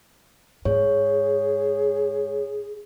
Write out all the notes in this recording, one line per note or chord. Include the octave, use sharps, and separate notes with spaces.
G#2 G#4 C#5